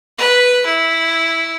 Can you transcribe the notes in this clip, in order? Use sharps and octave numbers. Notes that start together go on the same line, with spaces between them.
B4
E4